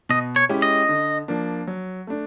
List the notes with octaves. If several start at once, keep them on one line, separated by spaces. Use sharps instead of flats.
B2 D#5
C#5
G#3 C#4 E4 G4
D#5
D3
F3 A#3 D4
F#3
A3 D4